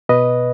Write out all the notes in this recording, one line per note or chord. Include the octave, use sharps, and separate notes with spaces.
B2 B4 D#5